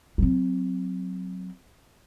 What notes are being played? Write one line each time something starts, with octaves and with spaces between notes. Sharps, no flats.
F#3 C4